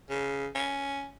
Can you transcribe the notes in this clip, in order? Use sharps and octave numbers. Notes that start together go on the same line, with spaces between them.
C#3
C#4